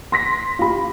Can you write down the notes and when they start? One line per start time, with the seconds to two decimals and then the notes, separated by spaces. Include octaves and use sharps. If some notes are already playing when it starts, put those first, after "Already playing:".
0.12 C6 A#6 B6
0.59 F4 G4 B5